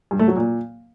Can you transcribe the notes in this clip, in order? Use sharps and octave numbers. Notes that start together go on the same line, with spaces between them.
G2
A3
F#3
A#2